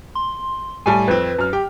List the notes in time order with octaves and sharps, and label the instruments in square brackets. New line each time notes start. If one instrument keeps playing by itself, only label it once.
[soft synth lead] C6
[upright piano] A2 G3 A5 [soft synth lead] G#5
[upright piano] F2 C4 [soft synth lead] B4
[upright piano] F#2 F6
[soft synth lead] G4 [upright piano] G5